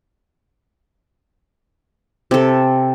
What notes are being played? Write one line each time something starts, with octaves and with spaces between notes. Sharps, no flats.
C3 A4